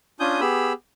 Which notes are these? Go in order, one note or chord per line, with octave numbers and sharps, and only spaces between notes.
C#4 D4 F4 G#5 D#6 G6
B3 G4 G#4 B5 E6